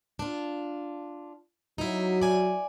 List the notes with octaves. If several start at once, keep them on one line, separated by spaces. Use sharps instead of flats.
D4 F4
F#3 D#4 E4
D5 G#5